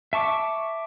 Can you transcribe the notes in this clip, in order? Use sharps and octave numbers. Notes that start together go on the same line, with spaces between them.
E5 A5 C#6 D6